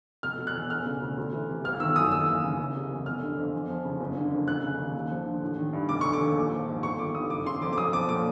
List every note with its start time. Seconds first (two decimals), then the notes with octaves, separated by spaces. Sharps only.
0.23 F1 F6
0.39 B2
0.47 F#6
0.55 E2
0.70 E1 F6
0.86 C#3
1.02 D2
1.17 D2
1.33 E3
1.49 C3
1.64 G1 F6
1.80 D#3 E6
1.96 F#2 D#6
2.12 D#2 E6
2.28 E3
2.43 C#3
2.59 F#1
2.75 C3
2.90 E2
3.06 F1 F6
3.22 D3
3.37 F2
3.53 E2
3.69 F3
3.85 C#3
4.00 F#1
4.16 D3
4.32 F2
4.47 F1 F#6
4.63 C#3
4.79 D#2
4.95 D#2
5.11 F3
5.26 D3
5.41 A1
5.58 D#3
5.73 G2
5.89 F1 D6
6.01 D3 C#6
6.13 D6
6.21 D#2
6.36 A#1
6.52 F3
6.67 G#2
6.83 G1 C#6
6.99 D#3 D6
7.15 G2 D#6
7.30 F#1 D6
7.46 C#3 C6
7.62 F2 D6
7.73 D6
7.77 B1 D#6
7.93 F3 D6
8.09 A#2 D6